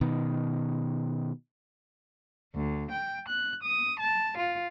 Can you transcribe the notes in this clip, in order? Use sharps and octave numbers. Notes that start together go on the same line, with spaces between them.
B2 D#3
D2
G5
F#6
D#6
A5
F4